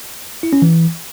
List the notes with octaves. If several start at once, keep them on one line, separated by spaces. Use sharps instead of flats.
E4
C#4
E3